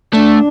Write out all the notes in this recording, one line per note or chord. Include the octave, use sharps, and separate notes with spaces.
A3 D4